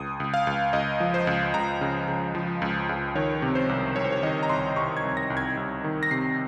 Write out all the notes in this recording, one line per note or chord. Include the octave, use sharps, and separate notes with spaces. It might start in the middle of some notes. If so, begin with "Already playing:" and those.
Already playing: C#2 D#6
C#2
F5
C#2
C#2 D#5
F3
C5
C#2
C#2 A#5
C#3
C#3
F3
C#2
C#2
D#3 C#5
C3
C5
C2
C2 C#5
C5
C#5
D#3 D#5
A#5
C2 C6
C2 C#6
G#6
C2
A#6
C2
G#6
C2
D#3
A#6
C3 C7